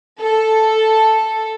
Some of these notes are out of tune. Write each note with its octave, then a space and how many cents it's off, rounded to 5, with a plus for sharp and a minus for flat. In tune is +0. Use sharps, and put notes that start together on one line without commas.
A4 +0